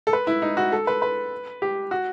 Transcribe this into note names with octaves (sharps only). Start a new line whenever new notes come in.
A4
B4
E4
D#4
F#4
A4
B4
B4
G4
F#4